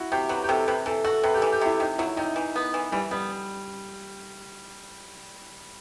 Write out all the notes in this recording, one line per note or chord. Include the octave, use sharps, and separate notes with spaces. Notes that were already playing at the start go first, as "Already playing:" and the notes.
Already playing: E4 F#4
C3 G4
F#3 B4
G4
C3 A4
C3 B4
E3 A4
F#4 A4
C3 B4
G4
A4
E3
G4
C3 E4
C3 D#4
F#3 E4
C3 D#4
E3
B3
E3
E3 G3
G3 B3